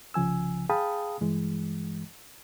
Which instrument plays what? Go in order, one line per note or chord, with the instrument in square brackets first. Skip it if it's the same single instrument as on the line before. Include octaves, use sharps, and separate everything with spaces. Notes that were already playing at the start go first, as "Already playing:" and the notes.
[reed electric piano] C2 C#3 F3 G#5 E6
G#4 F5 G5 A5 B5 D#6
G2 E3 G#3